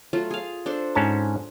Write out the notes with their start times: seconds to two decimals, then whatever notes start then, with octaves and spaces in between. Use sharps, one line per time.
0.13 F#3 A3 F4
0.31 G#4 F5
0.66 D4 A4 C5
0.95 G#2 C#4 A5